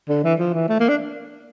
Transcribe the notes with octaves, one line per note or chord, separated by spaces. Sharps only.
D3
E3
F3
E3
A3
A#3
D4